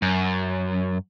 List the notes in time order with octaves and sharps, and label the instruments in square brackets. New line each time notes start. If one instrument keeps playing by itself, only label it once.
[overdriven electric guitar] F#2